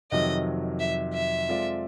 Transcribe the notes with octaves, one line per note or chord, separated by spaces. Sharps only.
F2 C3 D#3 F#3 D#5
E5
E5
G#3 C4 F4 A4 D5